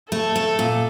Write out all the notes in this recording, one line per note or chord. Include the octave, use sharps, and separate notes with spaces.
A3 A4
A3
A#2